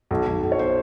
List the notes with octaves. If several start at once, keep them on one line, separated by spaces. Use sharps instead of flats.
B1
B1
B1
C#5
C5